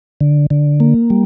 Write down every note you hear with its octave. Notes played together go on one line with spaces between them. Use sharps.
D3
D3
A#3
G3